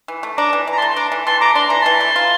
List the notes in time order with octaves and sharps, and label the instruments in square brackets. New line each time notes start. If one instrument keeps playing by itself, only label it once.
[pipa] E3
A3
[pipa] D4 [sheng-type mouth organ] A#5 D6
[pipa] E3
[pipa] E3 [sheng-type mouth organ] A#5
[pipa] A3 [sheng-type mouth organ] A5 C6
[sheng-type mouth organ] C6
[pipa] D4 [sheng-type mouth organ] A#5 D6
[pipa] E3
[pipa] E3 [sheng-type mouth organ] A5 C6
[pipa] A3 [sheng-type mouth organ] A#5 D6
[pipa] D4 [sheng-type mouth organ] C6
[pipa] E3 [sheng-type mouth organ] A#5
[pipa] E3 [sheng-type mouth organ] A5 C6
[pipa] A3
F4